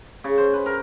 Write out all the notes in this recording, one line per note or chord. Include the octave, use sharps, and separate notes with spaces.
C#3
C5
B4
A#4